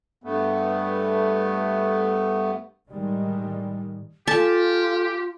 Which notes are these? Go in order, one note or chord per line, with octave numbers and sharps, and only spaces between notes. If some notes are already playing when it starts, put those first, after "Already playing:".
G2 A3 B3
A2 D#3 G3 G#3
F4 G4 A4 G#5 A5